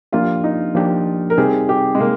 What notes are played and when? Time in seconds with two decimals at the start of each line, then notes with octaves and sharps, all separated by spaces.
0.13 F3 A#3 D4 F4 G4
0.44 D#4
0.75 F3 A#3 D4 G4
1.30 A#4
1.38 C3 G3 C4 D#4 G4 G#4
1.69 G4
1.95 G#3
2.00 C3 A#3